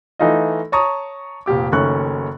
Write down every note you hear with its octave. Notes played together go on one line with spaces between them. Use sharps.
E3 A3 D#4 F4 D#5
C#5 A5 A#5 C#6 D#6
F1 A#2 G4 D6
F#1 D#3 A3 C#4 C#6 F#6